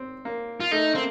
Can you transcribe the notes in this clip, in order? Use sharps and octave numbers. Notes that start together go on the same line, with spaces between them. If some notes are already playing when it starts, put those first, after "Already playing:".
Already playing: C4
A#3
F4
A3 D#4
A#3 C4